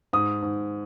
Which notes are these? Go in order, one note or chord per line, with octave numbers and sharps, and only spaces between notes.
G#2 D#6
G#2